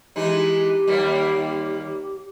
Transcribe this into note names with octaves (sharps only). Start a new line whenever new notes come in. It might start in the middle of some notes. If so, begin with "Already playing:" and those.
E3 G#3 D#4 G4
D#2 G3 A#3